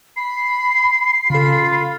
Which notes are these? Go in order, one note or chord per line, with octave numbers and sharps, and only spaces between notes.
B5 C7
C#3 F4 A4 B5